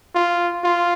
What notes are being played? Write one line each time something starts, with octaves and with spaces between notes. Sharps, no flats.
F4
F4